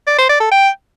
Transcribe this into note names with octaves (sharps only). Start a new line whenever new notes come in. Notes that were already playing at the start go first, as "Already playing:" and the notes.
D5
C5
D5
A4
G5